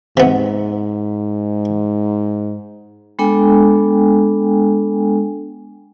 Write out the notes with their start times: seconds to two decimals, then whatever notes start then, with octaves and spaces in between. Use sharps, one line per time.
0.17 G#2 C3 B3
3.19 G#3 B3 D4 A4 G5 G#5